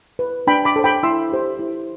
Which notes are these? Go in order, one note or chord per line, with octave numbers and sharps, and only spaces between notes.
B4
D4 G5 B5
B5 D6
A4 C5
G5 B5
E4 C6 E6
G4 C5
E4